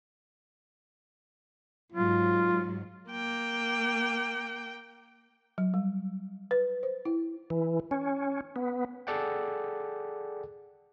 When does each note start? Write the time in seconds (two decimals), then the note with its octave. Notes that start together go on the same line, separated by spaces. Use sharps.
1.92 G#2 F#3 F4
3.10 A#3 G5
5.58 F#3
5.74 G3
6.51 B4
6.83 C5
7.05 E4
7.50 E3
7.91 C#4
8.56 B3
9.07 G#4 A4 D5 F#5 G5